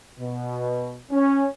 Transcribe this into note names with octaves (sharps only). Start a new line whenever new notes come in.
B2
C#4